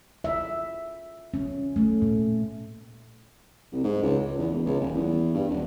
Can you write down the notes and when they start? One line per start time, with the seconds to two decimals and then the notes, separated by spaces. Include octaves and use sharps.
0.24 E5
1.34 C#4
1.76 A3
2.02 A#2
3.72 C2
3.84 G#2
4.03 C#2
4.26 C#2
4.39 E2
4.51 E1
4.66 C#2
4.81 D#1
4.94 E2
5.34 G2
5.49 D#1